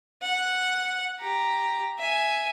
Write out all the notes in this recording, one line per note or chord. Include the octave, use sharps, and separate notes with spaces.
F#5
G4 A#5
E5 G#5